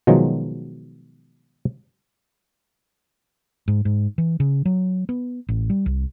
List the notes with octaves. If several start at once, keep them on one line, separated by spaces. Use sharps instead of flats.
B2 D#3 F3 F#3 G#3
G#2
G#2
E3
C#3
F#3
B3
A1
G3
C2